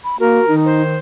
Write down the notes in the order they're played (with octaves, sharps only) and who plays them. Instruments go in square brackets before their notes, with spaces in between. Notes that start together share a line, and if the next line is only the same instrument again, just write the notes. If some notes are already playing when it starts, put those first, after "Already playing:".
[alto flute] B5
[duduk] A#3 [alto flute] F#4 [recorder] A#4
[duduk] D#3 [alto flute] D#4
[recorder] C5